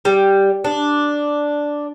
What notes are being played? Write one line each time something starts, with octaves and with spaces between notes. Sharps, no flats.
G3
D4